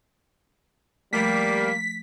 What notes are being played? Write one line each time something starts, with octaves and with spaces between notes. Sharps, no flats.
F3 G3 A3 A#3 B6